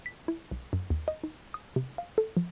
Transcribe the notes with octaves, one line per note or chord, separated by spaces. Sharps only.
B6
E4
B1
F#2
D#2
D#5
D#4
D#6
C3
F5
A4
F3